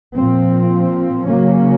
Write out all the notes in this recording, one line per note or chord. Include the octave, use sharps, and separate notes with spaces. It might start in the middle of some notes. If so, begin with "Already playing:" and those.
A#2 F3 C4
C#3 F#3 A#3 C#4